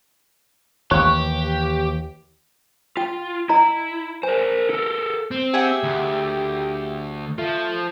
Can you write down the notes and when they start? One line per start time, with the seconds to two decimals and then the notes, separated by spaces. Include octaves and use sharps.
0.91 D#2 E3 G4 C#5 C#6 F#6
2.97 F4 G5
3.49 E4 D#5 A#5
4.23 A#4 C5 G#5
4.70 A4 A#4
5.31 C4
5.54 G4 G#4 E5 F#5
5.83 D2
7.38 F3 A3